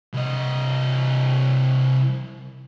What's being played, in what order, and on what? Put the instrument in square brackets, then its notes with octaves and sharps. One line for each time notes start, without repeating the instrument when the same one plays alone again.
[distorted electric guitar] C2 D#5